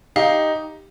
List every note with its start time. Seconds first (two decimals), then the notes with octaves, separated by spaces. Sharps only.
0.16 D#4 G4 F5